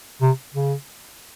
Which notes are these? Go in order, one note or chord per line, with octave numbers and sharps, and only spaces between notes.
C3
C#3